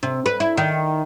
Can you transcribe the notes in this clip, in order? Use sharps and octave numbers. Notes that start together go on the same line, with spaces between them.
C3
B4
E4
D#3